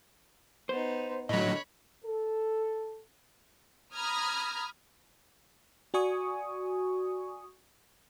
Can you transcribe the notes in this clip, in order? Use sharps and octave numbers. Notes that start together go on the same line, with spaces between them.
B3 D#4 C5
A2 D3 F#3 C#5 D#5 B5
A4
A#5 B5 D#6 F6 G#6
F#4 D5 G#5 C#6 D#6